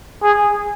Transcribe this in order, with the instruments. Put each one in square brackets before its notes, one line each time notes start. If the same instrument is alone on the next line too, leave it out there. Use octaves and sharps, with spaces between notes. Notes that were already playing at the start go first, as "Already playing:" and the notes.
[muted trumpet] G#4